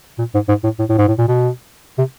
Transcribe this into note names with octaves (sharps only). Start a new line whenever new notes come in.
A#2
G#2
G#2
A2
A2
A2
G#2
A2
A#2
B2
C3